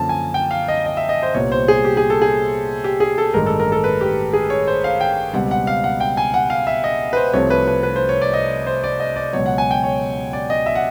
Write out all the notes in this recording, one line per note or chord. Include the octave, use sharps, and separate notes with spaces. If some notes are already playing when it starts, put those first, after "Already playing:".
Already playing: F#2 D3 F3 A#3 C#4 A5
G#5
G5
F5
D#5
D#5
E5
D#5
C5
C2 A#2 G3 B3 C#5
C5
G#4
G4
G#4
A4
G#4
G4
G#4
A4
A1 G2 D#3 G#3 A#4
A4
A#4
A4
B4
G4
G#4
C#5
C5
F5
G5
C#2 B2 G3 C4 F#5
F#5
F5
F#5
G5
G#5
F#5
F5
E5
D#5
B4
C5
C2 C3 F3 A3 C4 C#5
B4
B4
B4
C5
C#5
D5
D#5
C5
D5
D#5
D5
C#2 B2 F#3 C#5
F#5
G#5
G5
C#5
D5
D#5
E5
F#5